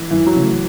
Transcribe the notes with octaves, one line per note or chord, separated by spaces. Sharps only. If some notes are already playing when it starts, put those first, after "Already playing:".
Already playing: E3
F#2 E3
F#3
C#3 E3 A3